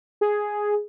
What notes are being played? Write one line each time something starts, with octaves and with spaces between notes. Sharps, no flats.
G#4